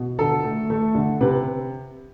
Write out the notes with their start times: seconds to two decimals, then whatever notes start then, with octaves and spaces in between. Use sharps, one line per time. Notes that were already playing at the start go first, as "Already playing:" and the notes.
Already playing: B2
0.19 D3 A4
0.44 A3
0.70 A3
0.95 D3
1.21 C3 B4